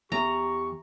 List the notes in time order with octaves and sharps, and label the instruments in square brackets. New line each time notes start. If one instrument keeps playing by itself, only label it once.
[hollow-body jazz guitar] E2 [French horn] G4 [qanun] A#5 [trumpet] C#6